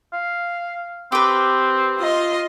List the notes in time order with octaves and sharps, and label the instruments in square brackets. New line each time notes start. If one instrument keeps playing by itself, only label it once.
[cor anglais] F5
[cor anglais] C4 [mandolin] G4 B4
[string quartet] F4 D#5 C6